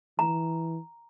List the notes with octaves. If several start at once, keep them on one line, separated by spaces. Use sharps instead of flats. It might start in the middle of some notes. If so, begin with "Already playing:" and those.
E3 A#5